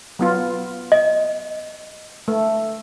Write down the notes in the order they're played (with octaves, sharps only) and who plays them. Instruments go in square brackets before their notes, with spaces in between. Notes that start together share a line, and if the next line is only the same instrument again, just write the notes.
[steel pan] F#3 B3 F4
[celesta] D#5
[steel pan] A3